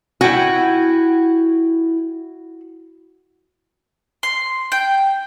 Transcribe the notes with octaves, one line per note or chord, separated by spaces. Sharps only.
E4 F#4 G5 G#5
C6
G5